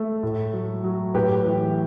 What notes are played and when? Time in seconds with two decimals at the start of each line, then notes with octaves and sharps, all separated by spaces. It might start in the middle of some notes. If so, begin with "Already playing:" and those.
Already playing: A3
0.23 A2
0.53 F#3
0.84 F#3
1.14 A2 G4 B4
1.45 E3